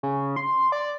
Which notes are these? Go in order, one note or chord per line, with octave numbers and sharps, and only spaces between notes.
C#3
C6
D5